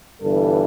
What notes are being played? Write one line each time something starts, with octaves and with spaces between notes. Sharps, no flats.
G1 G2 E3 A4